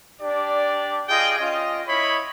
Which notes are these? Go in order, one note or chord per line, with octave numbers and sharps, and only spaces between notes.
D4 G4 D5
F4 G#4 D#5 G5
C#4 F4 D#5
E4 C#5 D#5 B5